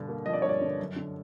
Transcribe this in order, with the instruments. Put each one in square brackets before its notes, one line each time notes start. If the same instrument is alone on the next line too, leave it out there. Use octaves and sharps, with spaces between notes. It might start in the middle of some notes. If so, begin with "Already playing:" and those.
Already playing: [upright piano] G2 B2 D3
A#3
F3 D#5
D5
G2 C#5
D5
D3
F#2
D3